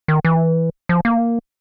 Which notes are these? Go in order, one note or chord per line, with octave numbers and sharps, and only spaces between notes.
D#3
E3
F3
A#3